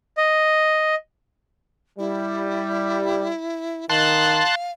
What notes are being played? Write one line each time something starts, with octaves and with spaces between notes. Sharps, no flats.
D#5
G3 E4
D#3 F5 A5 C6 F#6